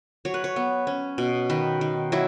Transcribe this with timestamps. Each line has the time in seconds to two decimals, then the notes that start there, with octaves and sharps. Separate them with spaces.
0.25 F#3 C#5
0.34 B4
0.44 C#5
0.56 B3
0.87 C#4
1.18 B2
1.50 D#3 B4
1.81 D#3
2.12 F#3 E4